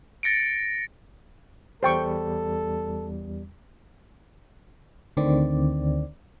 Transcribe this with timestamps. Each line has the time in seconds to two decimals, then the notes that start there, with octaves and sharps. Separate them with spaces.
0.23 A6 A#6 C#7 D7
1.83 E2 G3 A4 C5 G5 C#6
5.17 D2 D3 D#3 C4 D5